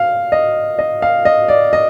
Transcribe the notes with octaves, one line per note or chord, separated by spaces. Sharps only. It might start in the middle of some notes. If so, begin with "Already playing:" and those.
Already playing: F5
D#5
D#5
F5
D#5
D5
D#5